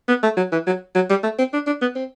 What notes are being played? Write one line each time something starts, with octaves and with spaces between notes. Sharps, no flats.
B3
A3
F#3
E3
F#3
F#3
G3
A3
C4
D4
D4
B3
C4